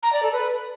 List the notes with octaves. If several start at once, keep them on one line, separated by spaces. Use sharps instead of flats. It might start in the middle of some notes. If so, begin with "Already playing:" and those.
A#5
D5
A4
B4